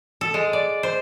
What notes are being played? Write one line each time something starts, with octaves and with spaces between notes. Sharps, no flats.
A4
G#3
D5
C5